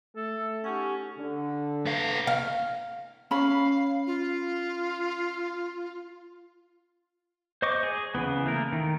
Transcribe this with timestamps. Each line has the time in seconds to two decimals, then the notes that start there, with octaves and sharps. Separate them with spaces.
0.17 A3 A4
0.64 C#4 D#4 G4 F#5
1.18 D3
1.86 B3 F5
2.27 F5
3.31 C#4 F5 B5
4.07 F4
7.62 C5 D#5 C#6 D6
7.83 G#4
8.15 C#3 E3 B3
8.46 A3 A#3 A#4
8.72 D#3